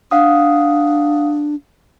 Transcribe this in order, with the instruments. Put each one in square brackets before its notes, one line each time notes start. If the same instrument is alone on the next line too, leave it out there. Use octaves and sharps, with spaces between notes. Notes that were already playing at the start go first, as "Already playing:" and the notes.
[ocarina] D4 [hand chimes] F5 F#5 D#6